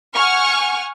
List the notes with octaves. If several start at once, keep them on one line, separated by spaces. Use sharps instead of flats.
F#5 G#5 C#6 F6